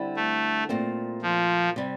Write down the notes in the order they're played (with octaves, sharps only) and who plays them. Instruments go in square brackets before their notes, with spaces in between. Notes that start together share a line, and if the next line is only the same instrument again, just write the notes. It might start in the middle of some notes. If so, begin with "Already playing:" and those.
Already playing: [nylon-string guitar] D3 G3 C4 E4
[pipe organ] A3
[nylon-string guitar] A#2 A3 C4
[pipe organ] F3
[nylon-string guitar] C3 G3